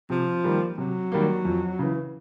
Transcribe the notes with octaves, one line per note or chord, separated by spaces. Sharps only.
C3 F3
D#3 G3 A#3
C3 F#3
D#3 G3 A#3
F2
C#3 E3